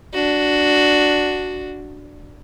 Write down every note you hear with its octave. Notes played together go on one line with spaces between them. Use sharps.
D4 F#4